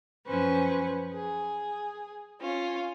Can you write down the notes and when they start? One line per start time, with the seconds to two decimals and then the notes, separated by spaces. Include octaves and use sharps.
0.26 F#2 F3 C#4 B4 C5 C#6
1.13 G#4
2.41 C#4 F4